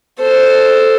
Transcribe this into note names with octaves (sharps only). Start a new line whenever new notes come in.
A4 C5